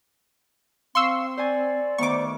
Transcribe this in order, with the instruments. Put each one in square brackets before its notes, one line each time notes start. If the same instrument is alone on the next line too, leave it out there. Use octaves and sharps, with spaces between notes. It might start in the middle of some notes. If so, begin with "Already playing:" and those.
[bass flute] C4 [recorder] F5 [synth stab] C6 C#6 E6
[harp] C5 G#5 [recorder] D5
[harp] D2 D#3 B3 [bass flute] C5 [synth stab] C#6 D6